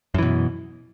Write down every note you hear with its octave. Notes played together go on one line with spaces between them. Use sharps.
F#2 B2 E3